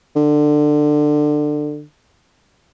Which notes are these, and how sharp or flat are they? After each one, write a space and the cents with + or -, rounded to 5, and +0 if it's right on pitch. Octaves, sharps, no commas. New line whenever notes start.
D3 +20